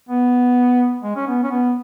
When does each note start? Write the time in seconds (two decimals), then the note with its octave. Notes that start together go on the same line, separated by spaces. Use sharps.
0.09 B3
1.03 G#3
1.16 C#4
1.27 B3
1.43 C#4
1.51 B3